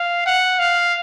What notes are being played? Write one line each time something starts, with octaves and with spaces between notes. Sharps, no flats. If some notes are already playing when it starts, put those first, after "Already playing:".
Already playing: F5
F#5
F5